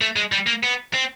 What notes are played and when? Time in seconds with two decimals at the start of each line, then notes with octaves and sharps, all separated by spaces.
0.01 A3
0.16 G#3
0.32 G3
0.47 A#3
0.63 B3
0.93 C4